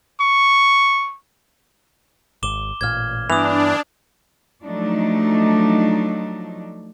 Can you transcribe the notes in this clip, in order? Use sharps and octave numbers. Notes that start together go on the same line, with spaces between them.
C#6
G#1 D6 E7 G7
A1 A#2 F6 G#6
G2 E3 B3 D4 D#6 F7
F3 F#3 A3 D4 D#4